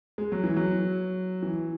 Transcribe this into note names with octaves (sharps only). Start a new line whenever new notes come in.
G#3
F#3
E3
F#3
E3